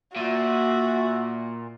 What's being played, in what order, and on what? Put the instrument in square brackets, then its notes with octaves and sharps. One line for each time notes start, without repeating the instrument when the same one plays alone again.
[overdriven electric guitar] A#2 [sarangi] F#4 [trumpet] E5